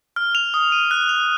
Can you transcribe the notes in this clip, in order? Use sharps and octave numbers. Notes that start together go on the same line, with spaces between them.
F6
F7
D#6
D#7
F#6
F7